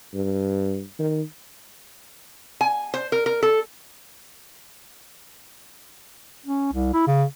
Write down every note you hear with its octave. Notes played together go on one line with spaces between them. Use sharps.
G2
D#3
G#5
C5
A#4
A#4
A4
C#4
C2
E4
C#3